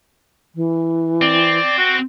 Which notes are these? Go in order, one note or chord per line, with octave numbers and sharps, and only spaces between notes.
E3
C4 D5
F#4